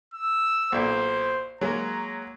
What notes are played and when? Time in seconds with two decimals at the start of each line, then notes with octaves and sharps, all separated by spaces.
0.14 E6
0.72 B1 A#2 C5
1.61 F#3 G#3 A#3 A#5